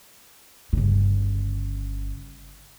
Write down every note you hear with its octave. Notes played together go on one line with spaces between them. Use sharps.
G1 C#3